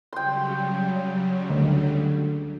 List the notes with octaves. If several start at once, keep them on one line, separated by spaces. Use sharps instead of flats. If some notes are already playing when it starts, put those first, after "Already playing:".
C#3 F#3 G3 G5 C6
D2 D3